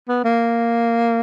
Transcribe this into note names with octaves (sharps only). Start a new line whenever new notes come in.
B3
A#3